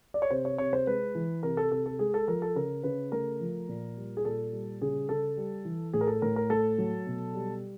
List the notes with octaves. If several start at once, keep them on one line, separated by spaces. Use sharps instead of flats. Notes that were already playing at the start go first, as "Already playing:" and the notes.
D5
C#5
C3 C5
C#5
C3 C#5
C5
G#3 B4
E3
C3 A#4
A4
C3 A4
A4
G#3 G#4
A4
F3 A#4
A4
C#3 A#4
C#3 B4
A3 A#4
F3
A#2
G3
G#4
A#2 A4
G3
C#3 G#4
C#3 A4
G3
E3
A2 G#4
A#4
A4
A2 A#4
A#4
A3 A4
F#3
B2
G3